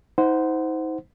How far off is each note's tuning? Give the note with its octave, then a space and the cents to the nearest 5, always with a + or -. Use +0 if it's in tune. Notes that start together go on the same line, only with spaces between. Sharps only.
D#4 +40 C5 -15 F#5 +0